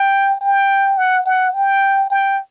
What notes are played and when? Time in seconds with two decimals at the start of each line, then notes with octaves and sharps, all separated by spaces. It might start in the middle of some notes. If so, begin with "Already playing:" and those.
Already playing: G5
0.41 G5
0.97 F#5
1.26 F#5
1.54 G5
2.10 G5